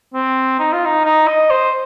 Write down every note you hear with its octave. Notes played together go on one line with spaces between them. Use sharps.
C4
D#4
F4
D#4
D#4
D#5
C5